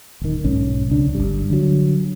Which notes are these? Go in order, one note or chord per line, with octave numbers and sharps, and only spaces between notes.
D1 D#3
B1 G#2 C#4
C#2 D4
G1 C#2 G2 G3
D3 F#3